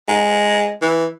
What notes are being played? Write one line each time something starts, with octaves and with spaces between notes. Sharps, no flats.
G#3
E3